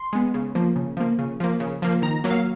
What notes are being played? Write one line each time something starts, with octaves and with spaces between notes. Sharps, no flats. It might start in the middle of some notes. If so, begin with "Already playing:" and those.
Already playing: C6
G#3 B3
C#3
F3 A#3
C#3
F3 A#3
C#3
F3 A#3
C#3
F3 A#3
D#3 A#5
F#3 A#3
F5